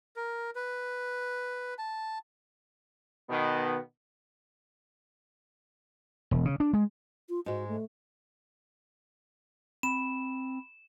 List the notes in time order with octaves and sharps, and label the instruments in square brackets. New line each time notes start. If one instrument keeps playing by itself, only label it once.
[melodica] A#4
B4
A5
[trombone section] B2 D#3 B3
[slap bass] E1
C#3
D4
G#3
[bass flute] F4
[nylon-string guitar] G#2 G#3 [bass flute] F#4
[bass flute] A3
[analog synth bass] C4 [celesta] B5 [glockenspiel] E7